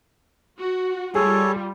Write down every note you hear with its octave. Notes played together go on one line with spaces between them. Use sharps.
F#4
G3 F4 G#4 A4 C#5